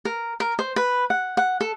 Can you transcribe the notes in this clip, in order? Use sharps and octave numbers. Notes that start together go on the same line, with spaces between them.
A#4
A#4
C5
B4
F#5
F#5
A4